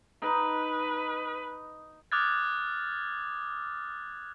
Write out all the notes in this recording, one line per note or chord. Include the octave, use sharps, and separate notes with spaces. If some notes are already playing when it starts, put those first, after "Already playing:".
D#4 B4
D6 D#6 F6 F#6 G#6 A6